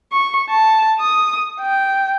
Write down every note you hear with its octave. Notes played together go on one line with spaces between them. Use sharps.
C#6
A5
D#6
G5